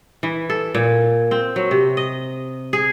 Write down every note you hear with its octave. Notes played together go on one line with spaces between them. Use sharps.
E3
A4
A#2
C4
F#3
C3
D#5
G#4